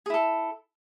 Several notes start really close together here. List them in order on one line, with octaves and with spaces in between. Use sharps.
G#4 E4 A4